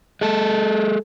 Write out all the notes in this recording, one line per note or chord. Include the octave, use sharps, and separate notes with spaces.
G#3 A4